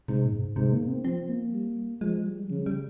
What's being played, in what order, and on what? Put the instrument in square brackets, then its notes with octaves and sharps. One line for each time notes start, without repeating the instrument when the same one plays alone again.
[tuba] G#2 [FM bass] C3
[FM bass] A#2
G2
G#2
[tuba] G#2 [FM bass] C3
[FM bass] A#3
C4
[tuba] F3 [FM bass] C4
[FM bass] A#3
[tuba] G3
[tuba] F3 [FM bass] G#3
[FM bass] G3
[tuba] C#3 [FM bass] F3
[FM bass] G3